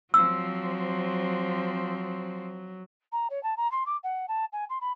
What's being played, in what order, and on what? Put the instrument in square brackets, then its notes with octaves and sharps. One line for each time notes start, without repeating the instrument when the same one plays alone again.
[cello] F3 C4 [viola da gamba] F#3 [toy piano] E6
[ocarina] A#5
C#5
A5
A#5
C6
D6
F#5
A5
G#5
C6
B5